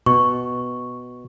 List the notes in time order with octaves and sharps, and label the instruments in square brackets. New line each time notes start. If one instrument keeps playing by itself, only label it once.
[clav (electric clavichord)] B2 [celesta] C#6